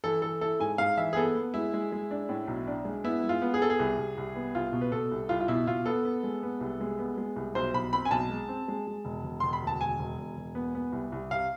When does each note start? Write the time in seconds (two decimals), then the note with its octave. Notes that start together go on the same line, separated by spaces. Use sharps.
0.04 E3 A4
0.22 E3 A4
0.41 E4 A4
0.60 G#2 G#5
0.78 G#2 F5
0.97 E3 E5
1.13 G#4
1.16 B3 A4
1.35 B3
1.54 G#3 E4
1.73 G#3
1.92 G#3
2.11 D4
2.29 A2
2.47 B1
2.67 D4
2.85 G#3
3.04 B3 E4
3.23 G#3
3.29 F4
3.42 B3
3.54 G#4
3.60 B3 A4
3.70 G#4
3.80 C2
3.99 C2
4.18 C2
4.35 B3
4.55 C2 F4
4.73 B2
4.81 B4
4.92 B2 A4
5.11 C2
5.29 C2 F4
5.40 F4
5.48 B2 E4
5.67 B2 F4
5.86 B3 A4
6.05 B3
6.23 G#3
6.43 B3
6.61 C2
6.81 G#3
6.99 B3
7.17 G#3
7.36 C2
7.55 B1 C5
7.74 B1 B5
7.93 C4 B5
8.05 G#5
8.11 B1 A5
8.30 G#3
8.49 C4
8.68 G#3
8.87 G#3
9.05 E1
9.24 E1
9.40 E1 C6
9.53 B5
9.62 D2 A5
9.81 E1 G#5
9.99 E1
10.18 E1
10.37 E1
10.55 B3
10.75 B3
10.93 C2
11.12 C2
11.31 C3 F5